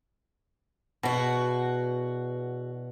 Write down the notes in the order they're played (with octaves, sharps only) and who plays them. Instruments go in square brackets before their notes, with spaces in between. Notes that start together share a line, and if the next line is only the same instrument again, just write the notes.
[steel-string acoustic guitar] E2 F#4 [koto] B2